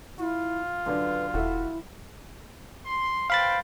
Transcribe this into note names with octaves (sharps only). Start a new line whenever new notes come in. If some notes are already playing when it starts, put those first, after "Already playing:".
E4 F4
F#2 D3 D4 B4
E1 E4 F#4 A4 E5
C6
B4 C5 F5 G5 B5 A6